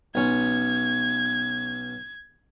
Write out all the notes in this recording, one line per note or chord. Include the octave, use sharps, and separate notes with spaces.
B1 C#4 G#6